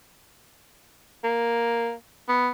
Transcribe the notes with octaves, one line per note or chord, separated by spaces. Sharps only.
A#3
B3